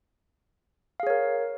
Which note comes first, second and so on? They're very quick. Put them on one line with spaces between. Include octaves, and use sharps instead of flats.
F5 G#4 C#5 A#4